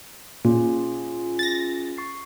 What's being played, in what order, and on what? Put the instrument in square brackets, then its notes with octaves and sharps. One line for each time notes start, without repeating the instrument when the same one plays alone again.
[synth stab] A#2 [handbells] C#4 F4 G#4
[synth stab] A6 A#6
[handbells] C#6 A6 C7